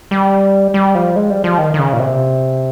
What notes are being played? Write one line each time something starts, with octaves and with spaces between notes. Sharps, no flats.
G3
G3
F3
G#3
G3
F3
D#3
D#3
C#3
A#2
C3